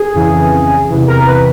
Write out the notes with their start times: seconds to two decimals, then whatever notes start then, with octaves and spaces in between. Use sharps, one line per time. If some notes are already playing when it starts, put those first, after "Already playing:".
Already playing: G#4
0.14 F2 C#3 E3
0.89 E2 C3 E3
1.07 A#4
1.26 B4